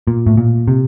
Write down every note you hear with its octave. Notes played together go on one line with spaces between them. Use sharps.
A#2
A2
A#2
C3